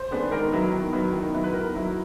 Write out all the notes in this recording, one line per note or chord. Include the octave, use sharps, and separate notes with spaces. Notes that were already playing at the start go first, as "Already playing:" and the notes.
Already playing: C5
D#3 G#3 B3 D4
D#3 A#4
F#3 B3 E4
D#3
F#3 B3 E4
D#3
F#3 B3 E4
B4
D#3 A#4
F#3 B3 E4